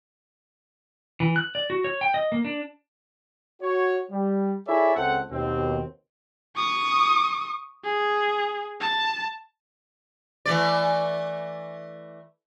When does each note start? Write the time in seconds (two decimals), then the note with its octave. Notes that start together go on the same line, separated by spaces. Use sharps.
1.20 E3
1.36 F#6
1.55 D5
1.70 F#4
1.84 C#5
2.01 G5
2.14 D#5
2.32 A#3
2.44 D4
3.62 F#4 C#5
4.11 G3
4.67 E4 G#4 A4 C#5 D5 E5
4.96 C#2 C4 A4 F#5
5.31 D#2 B2 C4
6.56 C#6 D#6
7.84 G#4
8.81 A5
10.46 E3 A3 D5